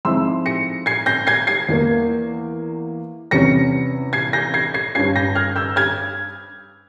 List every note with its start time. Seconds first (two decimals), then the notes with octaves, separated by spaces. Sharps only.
0.05 G#2 F3 G#3 C4 E4 C6 E6
0.46 A#6 C#7
0.86 G#6 C7
1.06 G6 A#6
1.27 G#6 C7
1.47 G#6 C7
1.69 E2 E3 A#3
3.31 E2 C3 G3 C#4 A#6 C#7
4.13 G#6 C7
4.33 G6 A#6
4.54 G#6 C7
4.74 G#6 C7
4.94 G2 G3 C#4 F4 G#6 C7
5.16 G6 A#6
5.35 F6 G#6
5.56 E6 G6
5.76 F6 G#6